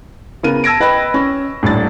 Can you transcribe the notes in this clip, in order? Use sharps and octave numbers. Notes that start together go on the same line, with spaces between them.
C#3 B3 A#4 D#7
A5 E6 G#6 A#6 D7
B4 D#5 G5 B5 A#6
C#4
D#1 A2 D4 A6